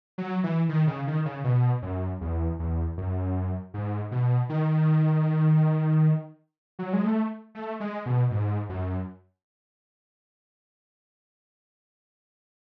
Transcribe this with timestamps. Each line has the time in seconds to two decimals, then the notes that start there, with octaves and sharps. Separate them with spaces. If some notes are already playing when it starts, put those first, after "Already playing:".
0.18 F#3
0.43 E3
0.69 D#3
0.87 C#3
1.07 D#3
1.25 C#3
1.44 B2
1.82 F#2
2.21 E2
2.59 E2
2.97 F#2
3.74 G#2
4.11 B2
4.49 D#3
6.79 F#3
6.93 G#3
7.05 A3
7.55 A3
7.80 G#3
8.06 B2
8.31 G#2
8.69 F#2